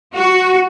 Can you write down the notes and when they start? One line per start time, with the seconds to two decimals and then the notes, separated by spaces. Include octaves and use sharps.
0.13 F#4